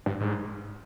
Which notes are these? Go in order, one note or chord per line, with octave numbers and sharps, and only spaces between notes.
G2
G#2